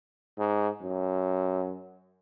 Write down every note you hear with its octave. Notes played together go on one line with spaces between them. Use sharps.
G#2
F#2